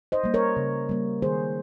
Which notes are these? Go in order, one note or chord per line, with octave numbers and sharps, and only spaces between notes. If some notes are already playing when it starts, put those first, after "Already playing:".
C5 D#5
G3 A#3
A#4 C#5
C#3
G3 A#3
D#3 G#4 C5